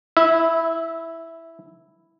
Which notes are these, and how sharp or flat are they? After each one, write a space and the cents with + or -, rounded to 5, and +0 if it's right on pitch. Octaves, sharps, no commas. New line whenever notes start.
E4 +0 E5 -20